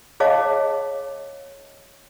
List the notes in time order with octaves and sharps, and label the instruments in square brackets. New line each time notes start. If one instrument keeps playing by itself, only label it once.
[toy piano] G#4 C#5 D#5 F5 A5 D6